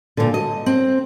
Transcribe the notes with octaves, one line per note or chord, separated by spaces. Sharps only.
A#2 D3
D#5
C4